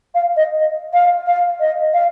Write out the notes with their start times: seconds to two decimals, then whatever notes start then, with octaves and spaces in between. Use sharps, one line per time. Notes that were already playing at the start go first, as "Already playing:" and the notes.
0.15 F5
0.37 D#5
0.93 F5
1.27 F5
1.60 D#5
1.94 F5